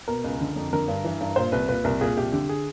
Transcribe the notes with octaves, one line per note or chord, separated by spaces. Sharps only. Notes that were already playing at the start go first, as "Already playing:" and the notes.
B2 A#4
C#2
D3
F2
D3 A#4
G2
E3
G2
A#2 C5
C2 B4
A#2 B4
C2 A#4
A#2 G#4
C2 G4
D3 G4
G#4